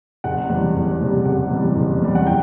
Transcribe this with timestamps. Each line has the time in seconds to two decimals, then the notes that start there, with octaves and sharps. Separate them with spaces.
0.24 F#1 F#5
0.50 E2 C3 G3
0.76 F#1
1.01 E2 C3 G3
1.25 F#1 F#5
1.51 E2 C3 G3
1.76 F#1
2.02 E2 C3 G3
2.15 F#5
2.27 G5